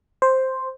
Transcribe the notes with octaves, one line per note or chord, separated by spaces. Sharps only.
C5